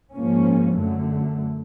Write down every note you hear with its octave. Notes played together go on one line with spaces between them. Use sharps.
G#2 F3 A#3 C#4
F#2 D3 F#3 A3